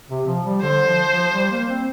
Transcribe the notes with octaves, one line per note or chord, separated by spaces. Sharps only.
C3
F3
G3
D3 C5
F3
F3
G3
A#3
C4